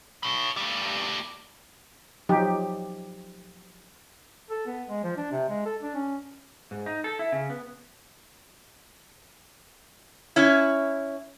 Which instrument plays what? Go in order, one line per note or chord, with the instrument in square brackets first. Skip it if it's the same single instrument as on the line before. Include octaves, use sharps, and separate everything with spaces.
[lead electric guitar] C#5 B5
G3 A3
[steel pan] F3 F#3 D#4 G4
[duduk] A4
B3
G#3
F3
D4
C3
G#3
A4
D4
C#4
[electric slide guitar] G#2
D#4
A4
E4
C#3
B3
[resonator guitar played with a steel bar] C#4 E4